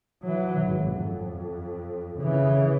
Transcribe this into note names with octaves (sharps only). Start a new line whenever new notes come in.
E3 F#3
G#1
F2
C#3 E3